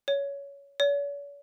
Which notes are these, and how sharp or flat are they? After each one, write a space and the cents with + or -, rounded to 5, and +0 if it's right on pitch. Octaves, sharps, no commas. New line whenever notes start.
C#5 +20
C#5 +45